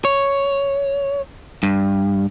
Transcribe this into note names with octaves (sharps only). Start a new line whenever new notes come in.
C#5
G2